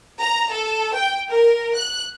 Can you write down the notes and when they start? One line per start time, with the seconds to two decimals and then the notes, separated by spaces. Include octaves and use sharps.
0.20 A#5
0.50 A4
0.94 G5
1.30 A#4
1.74 F#6